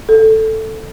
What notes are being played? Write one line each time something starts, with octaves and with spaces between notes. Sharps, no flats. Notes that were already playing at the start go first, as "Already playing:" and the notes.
A4